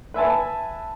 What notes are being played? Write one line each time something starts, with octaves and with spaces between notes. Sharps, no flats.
B4 E5 G#5 A5